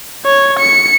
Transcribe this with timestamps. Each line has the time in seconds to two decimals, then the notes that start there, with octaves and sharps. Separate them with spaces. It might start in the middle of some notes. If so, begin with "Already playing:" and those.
0.26 C#5
0.60 C#7